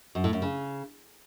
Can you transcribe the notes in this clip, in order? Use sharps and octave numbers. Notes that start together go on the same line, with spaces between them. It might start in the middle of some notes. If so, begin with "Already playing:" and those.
F#2
A2
F#2
C#3